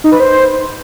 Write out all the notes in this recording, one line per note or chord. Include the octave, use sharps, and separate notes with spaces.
D#4
B4
C5